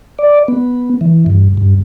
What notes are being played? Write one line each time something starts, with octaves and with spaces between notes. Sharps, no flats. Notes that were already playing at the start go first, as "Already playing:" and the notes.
D5
B3
E3
G2
G2